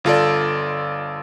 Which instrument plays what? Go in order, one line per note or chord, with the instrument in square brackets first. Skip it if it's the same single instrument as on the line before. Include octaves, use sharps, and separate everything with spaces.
[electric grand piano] G1 F4 A4 D5